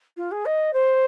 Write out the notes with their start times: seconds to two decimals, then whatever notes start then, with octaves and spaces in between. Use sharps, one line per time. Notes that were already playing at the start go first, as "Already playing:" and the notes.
0.17 F4
0.31 G#4
0.45 D#5
0.73 C5